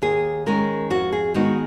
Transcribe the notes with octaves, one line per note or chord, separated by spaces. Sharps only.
D#2 G#4
D#3 G#3 C#4 A#4
F2 F#4
G#4
D#3 G#3 B3 D#4 F#4